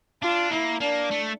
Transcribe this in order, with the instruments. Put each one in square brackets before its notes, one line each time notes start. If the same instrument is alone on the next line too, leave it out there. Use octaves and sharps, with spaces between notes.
[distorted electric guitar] D4 [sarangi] F4
[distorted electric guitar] A#3 [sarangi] E4
[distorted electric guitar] A#3 [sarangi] D4
[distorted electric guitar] A3